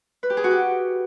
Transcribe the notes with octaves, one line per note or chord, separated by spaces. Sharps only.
B4
G4
G#4
F#4
G4